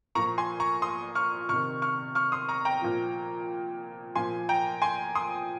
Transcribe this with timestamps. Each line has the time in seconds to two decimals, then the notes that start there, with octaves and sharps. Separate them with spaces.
0.15 A#2 A#5 C#6
0.18 F3
0.38 G#5 C6
0.60 A#5 C#6
0.82 C6 D#6
1.15 C#6 F6
1.49 C3 D#3 C#6 F6
1.82 C#6 F6
2.15 C#6 F6
2.32 C6 D#6
2.49 A#5 C#6
2.65 G5 A#5
2.82 A#2 F3
4.15 A#2 F3 G#5 C6
4.49 G5 A#5
4.82 G#5 C6
5.15 C6 D#6